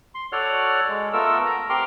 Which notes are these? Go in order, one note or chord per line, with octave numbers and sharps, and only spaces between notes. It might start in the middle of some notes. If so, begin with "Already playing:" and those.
C6
F#4 A4 C#5 D5 F#5 F6
G#3
A3 B3 F4 A4 A#4 E6
A#5
C4 G4 A#4 C6 D6 F6